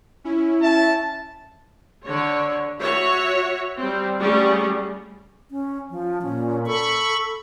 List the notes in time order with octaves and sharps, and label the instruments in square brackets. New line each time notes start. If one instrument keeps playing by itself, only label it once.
[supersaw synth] C#4 E4
[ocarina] E5 [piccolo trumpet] A5
[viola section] D3 C#5
F#4 C#5 E5
G3 C4
G3 A3 C#4 F#4 G#4
[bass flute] C#4
F3
[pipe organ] A#2 [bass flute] C#4
[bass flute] A4 [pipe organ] B5 C#6